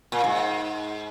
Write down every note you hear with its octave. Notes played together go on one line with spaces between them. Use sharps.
A#2
G#2